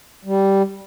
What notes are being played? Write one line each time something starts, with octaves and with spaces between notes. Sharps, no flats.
G3